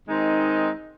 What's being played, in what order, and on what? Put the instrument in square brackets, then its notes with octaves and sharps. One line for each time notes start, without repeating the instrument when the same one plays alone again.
[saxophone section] D#3 G#3 C4 D#4